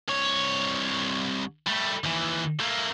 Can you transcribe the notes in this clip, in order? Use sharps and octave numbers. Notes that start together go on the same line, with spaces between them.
C2 C#5
G3 A3
D#2 E3
A3 A#3